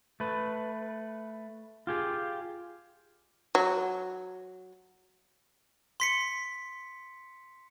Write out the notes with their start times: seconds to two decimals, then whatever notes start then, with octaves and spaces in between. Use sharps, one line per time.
0.20 A3 B4
1.87 F4 G4 G#4
3.55 F#3
6.00 C6 B6 C#7